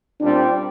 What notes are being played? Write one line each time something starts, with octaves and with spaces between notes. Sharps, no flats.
A#2 G3 C4 D4